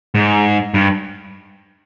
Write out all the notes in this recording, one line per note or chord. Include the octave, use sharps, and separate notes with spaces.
G#2
G2